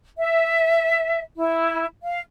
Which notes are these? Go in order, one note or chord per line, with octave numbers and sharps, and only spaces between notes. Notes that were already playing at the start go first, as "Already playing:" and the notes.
E5
E4
F5